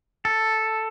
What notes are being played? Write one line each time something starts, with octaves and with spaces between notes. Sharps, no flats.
A4